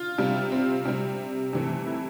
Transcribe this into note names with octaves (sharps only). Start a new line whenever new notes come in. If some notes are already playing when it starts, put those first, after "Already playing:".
Already playing: F4
C3 G3
C4
C3 G3
C3 E3 A3
E4